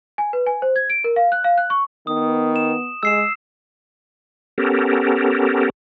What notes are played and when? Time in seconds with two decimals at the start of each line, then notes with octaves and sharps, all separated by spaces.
0.18 G#5
0.33 B4
0.47 G#5
0.62 C5
0.76 G#6
0.90 D7
1.04 A#4
1.16 F5
1.32 F#6
1.44 F5
1.58 F#6
1.70 C#6
2.07 D#3 B3 D#6
2.56 E7
3.03 G#3 E6 C7 E7
4.58 B3 C#4 G4 A4 A#4